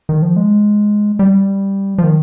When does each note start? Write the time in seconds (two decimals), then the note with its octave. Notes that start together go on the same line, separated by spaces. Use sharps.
0.09 D#3
0.22 F3
0.36 G#3
1.19 G3
1.98 F3
2.04 D#3